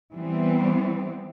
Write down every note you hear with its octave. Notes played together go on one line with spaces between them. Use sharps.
E3 G3 B3 C4